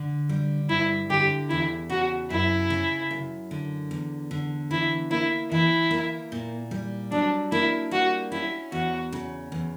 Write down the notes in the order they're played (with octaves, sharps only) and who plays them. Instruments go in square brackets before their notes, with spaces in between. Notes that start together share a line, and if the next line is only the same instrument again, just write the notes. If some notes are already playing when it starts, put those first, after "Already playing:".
Already playing: [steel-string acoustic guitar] D3
G3
[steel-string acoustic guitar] G2 [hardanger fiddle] E4
[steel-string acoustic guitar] D3 [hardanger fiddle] G4
[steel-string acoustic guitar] E2 [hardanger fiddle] E4
[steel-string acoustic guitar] C#3 [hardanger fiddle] F#4
[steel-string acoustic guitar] F#2 [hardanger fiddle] E4
[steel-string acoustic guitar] C#3
F#2
D3
E2
D3
[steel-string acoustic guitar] E3 [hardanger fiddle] E4
[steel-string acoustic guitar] A#3 [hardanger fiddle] E4
[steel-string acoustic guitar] E3 [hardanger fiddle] E4
[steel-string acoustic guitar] A#3
A#2
G3
[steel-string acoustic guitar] F#3 [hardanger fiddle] D4
[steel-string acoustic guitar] A#3 [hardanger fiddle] E4
[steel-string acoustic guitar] G3 [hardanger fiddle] F#4
[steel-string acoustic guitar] C#4 [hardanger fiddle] E4
[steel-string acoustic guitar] E2 [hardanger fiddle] F#4
[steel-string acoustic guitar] C#3
E2